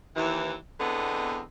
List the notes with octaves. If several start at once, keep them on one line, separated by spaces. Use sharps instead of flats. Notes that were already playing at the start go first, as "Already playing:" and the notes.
D#2 E3
E2 D3 B3 C4 D#5